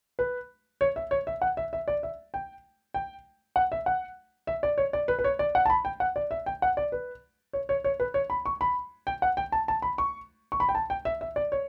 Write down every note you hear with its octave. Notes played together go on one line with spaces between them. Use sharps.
B4
C#5
E5
C#5
E5
F#5
E5
E5
D5
E5
G5
G5
F#5
E5
F#5
E5
D5
C#5
D5
B4
B4
C#5
D5
F#5
A5
B5
G5
F#5
D5
E5
G5
F#5
D5
B4
C#5
C#5
C#5
B4
C#5
B5
C#6
B5
G5
F#5
G5
A5
A5
B5
C#6
C#6
B5
G5
A5
G5
E5
E5
D5
C#5